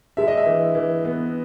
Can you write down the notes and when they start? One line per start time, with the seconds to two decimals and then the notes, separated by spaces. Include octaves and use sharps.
0.17 G#3 E5
0.28 D#5
0.37 E5
0.46 E3
0.75 E3
1.04 B3